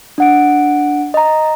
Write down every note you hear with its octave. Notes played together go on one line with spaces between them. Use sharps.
D4 F#5 D7
D#5 A#5